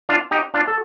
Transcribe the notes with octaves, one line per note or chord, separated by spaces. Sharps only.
D4 F4
D#4 G4
D4 F4
A4